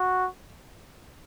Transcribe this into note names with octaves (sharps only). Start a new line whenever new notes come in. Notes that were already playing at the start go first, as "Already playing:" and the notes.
Already playing: F#4